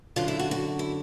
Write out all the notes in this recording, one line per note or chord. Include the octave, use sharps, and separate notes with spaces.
F#2 D3 F4
E4
F#4
F#4
E4